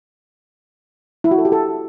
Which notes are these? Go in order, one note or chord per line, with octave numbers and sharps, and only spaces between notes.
E4
F#4
A4
G4
A4